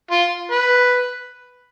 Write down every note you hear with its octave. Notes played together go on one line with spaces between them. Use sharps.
F4
B4